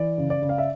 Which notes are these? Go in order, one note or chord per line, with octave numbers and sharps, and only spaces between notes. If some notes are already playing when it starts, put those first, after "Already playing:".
Already playing: E3 D5
C#3
D5
C#3
F5
E5